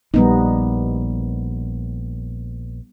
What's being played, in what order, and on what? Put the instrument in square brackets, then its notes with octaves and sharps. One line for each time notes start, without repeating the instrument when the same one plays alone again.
[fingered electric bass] A#1 [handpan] G3 B3 D#4